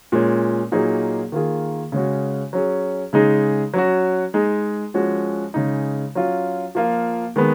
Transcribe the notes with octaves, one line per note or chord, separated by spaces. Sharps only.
A#2 G#3 C#4
A#2 F#3 A#3 D#4 G#4
D#3 A#3 F4 G#4
C#3 G#3 C#4 F#4
F#3 C#4 G#4
C#3 G#3 D#4 G#4
F#3 C#4 F#4
G#3 D#4 G#4
F3 G#3 C#4 F#4
C#3 G#3 D#4
F#3 C#4 F4
F3 A#3 F4
D#3 G#3 B3